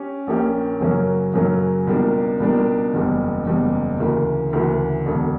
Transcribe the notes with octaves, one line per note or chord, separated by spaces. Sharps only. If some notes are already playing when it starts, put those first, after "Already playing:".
Already playing: C#4 G4
A#1 A#2 A#3 C#4 G4
F#2 C#3 F#3 A#3 C#4
F#2 C#3 F#3 A#3 C#4
C#2 B2 G3 A#3 D4
C#2 B2 G3 A#3 D4
F#1 E2 C#3 G3
F#1 E2 C#3 G3
D2 C#3 E3 A#3
D2 C#3 E3 A#3
E1 E2 D3